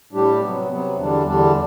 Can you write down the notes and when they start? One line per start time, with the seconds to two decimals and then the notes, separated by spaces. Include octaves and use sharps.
0.12 A2 G3 D4 G4
0.40 C3 F#3 B3
0.68 C3 F#3 B3
0.96 E2 D3 G3 D4
1.24 E2 D3 G3 D4